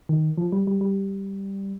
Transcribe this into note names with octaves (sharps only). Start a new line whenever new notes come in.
D#3
F3
G3
G3
G3